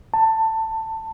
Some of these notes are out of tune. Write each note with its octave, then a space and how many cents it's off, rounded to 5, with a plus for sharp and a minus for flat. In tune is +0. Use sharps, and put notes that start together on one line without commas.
A5 +15